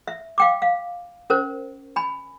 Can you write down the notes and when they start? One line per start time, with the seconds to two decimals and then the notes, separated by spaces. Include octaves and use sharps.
0.07 E5
0.38 F5 G5 D6
0.62 F5
1.30 C#4 A#4 C5
1.96 G#5 B5